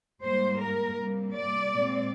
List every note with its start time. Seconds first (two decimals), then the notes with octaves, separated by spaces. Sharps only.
0.23 G#2 G3 A#3 C5
0.60 A#4
0.97 C3 G3 A#3
1.35 D5
1.72 A#2 G#3 C4